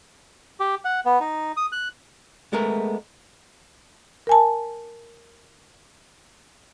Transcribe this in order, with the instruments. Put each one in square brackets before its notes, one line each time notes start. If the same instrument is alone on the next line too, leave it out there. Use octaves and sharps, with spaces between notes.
[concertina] G4
F#5
B3
D#4
D#6
F#6
[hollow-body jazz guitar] G#3 A3 B3 A#4
[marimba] A#4 G#5 A5